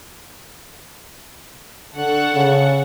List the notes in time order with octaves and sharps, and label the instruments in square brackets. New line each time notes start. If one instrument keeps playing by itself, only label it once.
[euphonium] D3 [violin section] A4 F#5 C#6
[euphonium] C#3